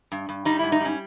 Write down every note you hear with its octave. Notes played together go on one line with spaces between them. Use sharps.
G2
G2
G3 D#4
G#2 E4
D#4
G3 C#4